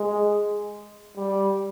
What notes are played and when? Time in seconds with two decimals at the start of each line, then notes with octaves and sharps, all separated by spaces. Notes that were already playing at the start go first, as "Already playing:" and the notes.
Already playing: G#3
1.17 G3